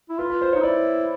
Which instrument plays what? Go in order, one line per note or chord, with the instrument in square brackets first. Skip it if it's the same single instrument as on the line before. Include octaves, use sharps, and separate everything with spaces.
[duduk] E4
[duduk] F4 [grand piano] B4
[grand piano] B4
C5
[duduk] D#4 [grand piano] C#5
[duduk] E4 [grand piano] D5